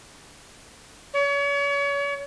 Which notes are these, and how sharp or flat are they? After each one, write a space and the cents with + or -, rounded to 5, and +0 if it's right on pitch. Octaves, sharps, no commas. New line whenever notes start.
C#5 +35